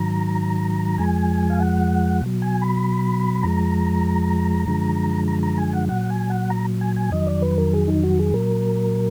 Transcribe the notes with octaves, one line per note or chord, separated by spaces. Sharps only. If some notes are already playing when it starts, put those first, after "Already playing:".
Already playing: G#2 D#3 F#3 A#5
F2 F3 G#3 G#5
F5
F#5
B2 F#3
G#5
B5
F2 F3 G#3 A#5
F#2 D3 F3 G#3
A#5
A#5
G#5
F#5
A#2 F#3 F#5
G#5
F#5
A#5
G#5
G#5
F2 D#3 F#3 D#5
D5
B4
A#4
G#4
D#4
F#4
G#4
A#2 F#3 A#4